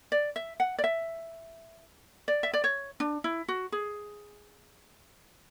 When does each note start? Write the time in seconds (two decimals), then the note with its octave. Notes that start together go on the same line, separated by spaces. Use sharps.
0.12 D5
0.36 E5
0.60 F#5
0.78 D5
0.84 E5
2.28 D5
2.43 E5
2.53 D5
2.64 C#5
3.00 D4
3.24 E4
3.48 F#4
3.72 G#4